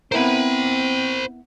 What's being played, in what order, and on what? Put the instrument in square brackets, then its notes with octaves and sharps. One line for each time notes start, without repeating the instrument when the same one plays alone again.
[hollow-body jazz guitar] B3 E4 A#4 [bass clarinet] C4 [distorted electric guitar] C5 B5